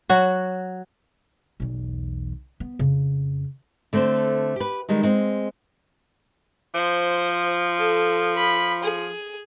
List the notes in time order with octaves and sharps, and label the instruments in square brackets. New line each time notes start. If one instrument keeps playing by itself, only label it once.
[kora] F#3 F#4
[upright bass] B1 E2
B3
F2 C#3
[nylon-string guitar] D3 A3 C4 C5
G4 B4
D#3 G3 G#3 D#4
G#3 C4
[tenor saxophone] F3 [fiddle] C5
[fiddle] A4
B5
G#4